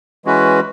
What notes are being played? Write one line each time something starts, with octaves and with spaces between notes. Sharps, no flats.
E3 G#3 C#4 F#4 B4